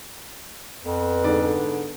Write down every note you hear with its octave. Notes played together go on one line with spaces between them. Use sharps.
F2 B3 B4
G#2 D3 D5